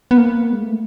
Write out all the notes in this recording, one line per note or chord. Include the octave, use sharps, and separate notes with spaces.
B3
A#3
G#3
A3